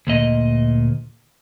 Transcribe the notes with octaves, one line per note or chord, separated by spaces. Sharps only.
D2 A#2 D#5